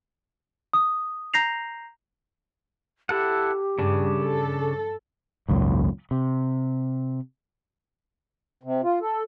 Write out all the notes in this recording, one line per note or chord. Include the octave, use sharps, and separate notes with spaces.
D#6
A#5 G6 A#6 C7 F7
E4 G4 A4 F#5
G2 C#3 D4
A4
G#1 C#2 F#2 A#2
C3
C3
F4
A4